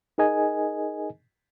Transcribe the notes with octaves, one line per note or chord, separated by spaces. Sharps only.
D#4 G#4 A#4 D#5 G#5